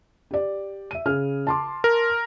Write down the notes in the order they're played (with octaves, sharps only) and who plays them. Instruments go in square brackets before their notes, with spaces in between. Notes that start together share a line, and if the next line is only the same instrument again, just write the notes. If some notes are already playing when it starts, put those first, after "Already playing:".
[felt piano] G4 D5
E5 D#7
C#3 G#4 F6
A5 C6 D6
[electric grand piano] A#4